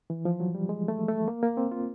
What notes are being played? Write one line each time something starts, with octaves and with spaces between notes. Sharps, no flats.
E3
F3
F#3
G3
G#3
A3
A3
A#3
A#3
C4
F4